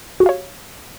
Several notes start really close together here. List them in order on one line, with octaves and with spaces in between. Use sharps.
F#4 G4 F5 C#5